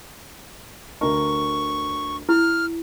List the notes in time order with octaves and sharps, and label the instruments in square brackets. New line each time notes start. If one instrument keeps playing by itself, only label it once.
[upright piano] D2 A#4 [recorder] C#6
[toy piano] E4 [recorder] F6